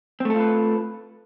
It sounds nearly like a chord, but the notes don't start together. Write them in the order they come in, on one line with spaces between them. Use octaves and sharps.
C4 A3 A4 F4 B4